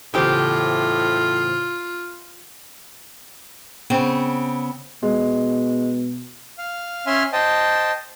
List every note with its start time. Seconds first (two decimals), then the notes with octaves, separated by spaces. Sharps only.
0.14 E2 A2 C#3 F4 G4 C5 D#6
3.90 C#3 B3 C4
5.03 B2 G#3
6.58 F5
7.06 C#4 E5 G#5 C6 F6
7.33 C5 D#5 G5 A5